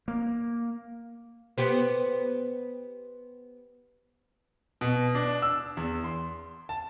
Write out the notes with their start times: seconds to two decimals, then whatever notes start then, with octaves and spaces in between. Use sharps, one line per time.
0.08 A#3
1.58 B3 G4 C5
4.81 B2
5.15 D4
5.42 E6
5.77 E2
6.04 C6
6.69 A5